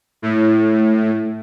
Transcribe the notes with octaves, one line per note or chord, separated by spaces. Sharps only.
A2